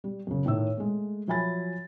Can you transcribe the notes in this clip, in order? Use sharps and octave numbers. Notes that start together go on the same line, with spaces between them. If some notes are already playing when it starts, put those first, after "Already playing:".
G3
F#2 C#3
A2 D#3 C#5 E5 E6
G#3 A3
F3 F#3 E5 G#5 B5 A6